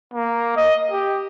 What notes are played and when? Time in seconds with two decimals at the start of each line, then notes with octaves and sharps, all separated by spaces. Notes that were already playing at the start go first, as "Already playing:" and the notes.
0.14 A#3
0.57 D#5
0.91 G4